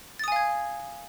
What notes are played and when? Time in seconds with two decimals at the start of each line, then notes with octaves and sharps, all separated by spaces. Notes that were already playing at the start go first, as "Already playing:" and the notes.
0.19 A6
0.24 D#6
0.28 G#5
0.32 F5
0.36 G#6